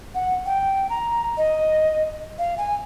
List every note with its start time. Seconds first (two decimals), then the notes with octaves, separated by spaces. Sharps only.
0.15 F#5
0.46 G5
0.90 A#5
1.38 D#5
2.39 F5
2.58 G#5